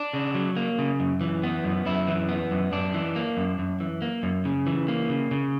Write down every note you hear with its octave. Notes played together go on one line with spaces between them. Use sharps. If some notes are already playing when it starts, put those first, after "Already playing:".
Already playing: D4
C#3
F#3
A#3
C#3
F#2
E3
B3
F#2
F#2 E4
E3
B3
F#2
F#2 D4
E3
A#3
F#2
F#2
E3
A#3
F#2
C#3
E3
A#3
C#3
C#3